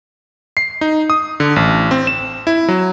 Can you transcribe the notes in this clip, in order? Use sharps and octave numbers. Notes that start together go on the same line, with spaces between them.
C7
D#4
D#6
D3
A1
C4
E7
E4
F#3